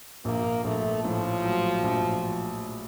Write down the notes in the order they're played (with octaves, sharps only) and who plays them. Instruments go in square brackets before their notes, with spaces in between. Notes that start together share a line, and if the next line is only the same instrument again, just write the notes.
[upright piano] A#1 [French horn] A#3
[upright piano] A#1 [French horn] A3
[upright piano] A2 [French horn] F3
[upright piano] F#3
A#1